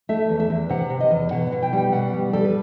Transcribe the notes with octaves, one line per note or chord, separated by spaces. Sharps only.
A3 E5
E2
E5
E2
C3 F#5
C3
D#5
E2
B2 F#5
F#5
B2
G5
G3 G5
B2 F#5
G3
G3 A4
B4